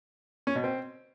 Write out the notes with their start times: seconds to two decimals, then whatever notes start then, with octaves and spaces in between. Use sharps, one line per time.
0.47 C#4
0.55 B2
0.64 C4